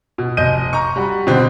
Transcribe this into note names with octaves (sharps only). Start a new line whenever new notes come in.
B2
F1 D#5 G6 D#7
A#5 C#6
G3 F#4
B2 D3 C4